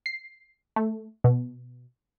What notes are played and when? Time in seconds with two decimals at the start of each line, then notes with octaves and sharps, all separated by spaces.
0.06 C7
0.76 A3
1.24 B2